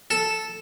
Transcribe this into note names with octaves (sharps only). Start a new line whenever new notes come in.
A4